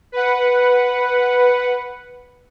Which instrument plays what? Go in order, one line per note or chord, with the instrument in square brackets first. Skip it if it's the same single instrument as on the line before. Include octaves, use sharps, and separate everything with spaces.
[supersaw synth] B4 F#5